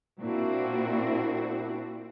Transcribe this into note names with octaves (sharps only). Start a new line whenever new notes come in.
A#2 A#3 C4 D4 E4 F#4